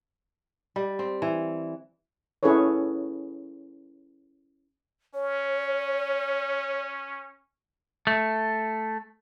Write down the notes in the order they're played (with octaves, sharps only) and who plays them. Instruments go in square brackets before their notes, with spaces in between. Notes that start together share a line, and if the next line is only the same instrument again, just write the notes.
[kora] G3
C4
E3
[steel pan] C#4 E4 G#4 A4 B4 C#5
[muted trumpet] C#4 [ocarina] C#5
[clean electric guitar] A3